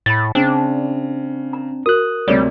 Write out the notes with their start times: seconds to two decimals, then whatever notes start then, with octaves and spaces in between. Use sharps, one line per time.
0.06 A2 B5 A6
0.35 C#3 C4 D4
1.53 A#5
1.86 F#4 A#4 D#6 F#6
2.28 D2 C3 G3 G#4 C#5 D5